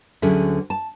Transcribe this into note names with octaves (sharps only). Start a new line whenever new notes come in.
D2 D3 F#3 C#4 G#4 E5
A5